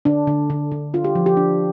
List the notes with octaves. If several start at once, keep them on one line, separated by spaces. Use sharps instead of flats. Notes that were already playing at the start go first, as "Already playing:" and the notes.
D3 D4
D3
D3
D3
D4 F4
G4
F3
G4
D4